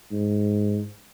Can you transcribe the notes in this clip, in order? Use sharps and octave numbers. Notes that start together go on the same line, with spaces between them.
G#2